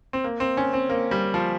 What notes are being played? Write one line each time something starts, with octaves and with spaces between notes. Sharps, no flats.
C4
A#3
C4
C#4
C4
A#3
G3
F3